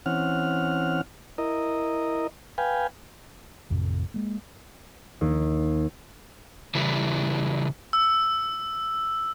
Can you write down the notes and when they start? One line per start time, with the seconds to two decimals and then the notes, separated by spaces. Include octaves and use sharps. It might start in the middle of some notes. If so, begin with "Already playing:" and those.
0.06 E3 C4 C#4 F#5 F6
1.38 E4 A#4 D#5
2.58 B4 F5 G5 G#5
3.70 A1 F2 A2 C3
4.14 G#3 A#3
5.21 D#2
6.75 C#3 E3 G3 E4
7.93 E6